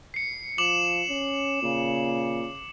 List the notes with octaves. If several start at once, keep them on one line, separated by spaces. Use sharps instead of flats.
C7 C#7
F3 D6 E7 F#7
C#4
A#2 C#3